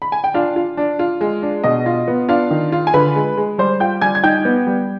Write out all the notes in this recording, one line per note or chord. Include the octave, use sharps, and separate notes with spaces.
B5
G#5
G5
D4 F4 F5
F4
D4
F4
G#3
D4
B2 D#5
F4
B3
D4 F4 F5
D#3
F4
G#5
D3 B4 B5
G#3
G#3
G3 C5 C6
F4 G5 G6
G3 G#5 G#6
G#6
D#4 G5 G6
B3
G3